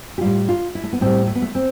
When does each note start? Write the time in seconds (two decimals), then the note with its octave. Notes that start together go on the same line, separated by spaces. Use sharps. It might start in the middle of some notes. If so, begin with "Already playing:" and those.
0.18 G4
0.21 A2 G3 F4
0.49 F4
0.75 E4
0.83 A3
0.93 B3
1.01 A2 G3 C4
1.27 A3
1.35 B3
1.42 A3
1.55 C4